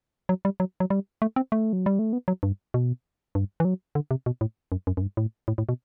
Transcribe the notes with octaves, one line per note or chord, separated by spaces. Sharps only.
F#3
G3
F#3
F#3
G3
A3
C4
A3
F#3
G3
A3
B3
F#3
G2
B2
G2
E3
F#3
D3
C3
B2
A2
F#2
F#2
F#2
G2
A2
A2
A2
B2